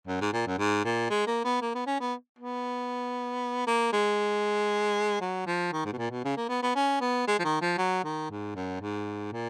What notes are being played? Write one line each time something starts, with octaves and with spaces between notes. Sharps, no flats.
F#2
G#2
A#2
F#2
G#2
A#2
G#3
A#3
B3
A#3
B3
C#4
B3
B3
A#3
G#3
F#3
F3
D#3
G#2
B2
A#2
B2
C#3
A#3
B3
B3
C#4
B3
G#3
F3
D#3
F3
F#3
D#3
G#2
F#2
G#2
A#2